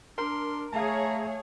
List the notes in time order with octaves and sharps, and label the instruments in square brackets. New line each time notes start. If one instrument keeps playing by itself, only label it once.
[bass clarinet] D4 [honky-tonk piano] A#4 [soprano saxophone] C6
[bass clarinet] A3 [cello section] G#4 C#5 [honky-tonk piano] F5 A5 [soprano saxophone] A#5